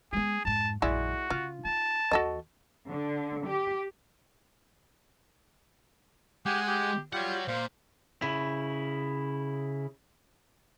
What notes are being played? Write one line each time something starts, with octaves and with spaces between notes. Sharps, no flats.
G#3 B3 G#4
F2 G#2 A5
A#1 F#2 G#3 E4 F#4 D5
C#3 F4
D#4 A5
D#2 E3 F#4 A4 D#5
D3
G4
G#3 G4 F#5 G#5
G4
G3 F4 G4 C#5 F#5
A#2 C5 F5
C#3 E4